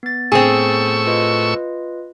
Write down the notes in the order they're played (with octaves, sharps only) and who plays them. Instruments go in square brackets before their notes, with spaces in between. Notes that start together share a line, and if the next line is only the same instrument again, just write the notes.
[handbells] B3 A6
[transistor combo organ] A2 C#6 E6 [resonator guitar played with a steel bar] C4 G#4
[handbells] F4 B4 D#5